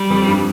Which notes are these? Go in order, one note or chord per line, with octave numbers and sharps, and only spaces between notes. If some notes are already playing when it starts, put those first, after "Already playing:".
Already playing: G3
F2
G2